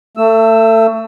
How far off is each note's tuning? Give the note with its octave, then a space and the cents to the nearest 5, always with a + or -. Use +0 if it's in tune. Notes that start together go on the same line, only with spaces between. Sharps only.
A3 +30 E6 +0